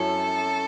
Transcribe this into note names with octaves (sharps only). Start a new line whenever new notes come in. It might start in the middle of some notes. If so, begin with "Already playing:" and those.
Already playing: F#2 F#3 C#4 E4 A4